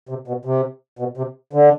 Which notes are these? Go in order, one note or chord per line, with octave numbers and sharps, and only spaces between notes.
C3
B2
C3
B2
C3
D3